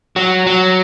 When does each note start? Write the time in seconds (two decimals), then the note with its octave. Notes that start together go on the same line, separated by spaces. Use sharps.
0.16 F#3
0.47 F#3